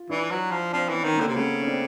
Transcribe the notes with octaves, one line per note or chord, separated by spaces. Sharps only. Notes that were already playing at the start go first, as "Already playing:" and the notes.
Already playing: F4
E3 D4 E4
F#3
F3
F3 C4 D4
E3 B3 C#4
D#3
A#3 C4
D3
C3
C#3 A3 B3
C#4
C4 D4